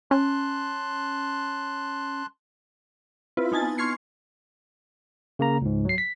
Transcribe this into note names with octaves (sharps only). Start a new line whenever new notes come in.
C#4 A5 C6 F#6
C4 E4 F4 B4
B3 D#4 G#5 A5 A6
C6 C#6 F6 G#6 C7 C#7
C#3 A#3 A#5
C#2 G#2
F#3 C7
B6